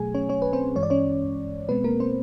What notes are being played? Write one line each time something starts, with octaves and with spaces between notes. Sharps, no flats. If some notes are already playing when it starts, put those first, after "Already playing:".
Already playing: B2 F#3 A3 G#4 G#5
C#4 C#5
C#4 C#5
B4
C4 C5
G2 E3 G#3 C#5
D5
C#4 C#5
B2 G#3 B3 C4 B4
A#3 A#4
C4 C5